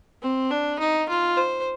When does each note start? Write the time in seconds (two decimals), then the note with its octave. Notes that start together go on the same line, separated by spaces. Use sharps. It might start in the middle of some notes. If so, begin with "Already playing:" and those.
0.22 C4
0.51 D4
0.79 D#4
1.08 F4
1.37 C5